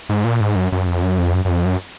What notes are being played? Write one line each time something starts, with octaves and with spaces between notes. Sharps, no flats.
G#2
A#2
G#2
F#2
F#2
F2
F#2
F2
F#2
F#2
F2
F#2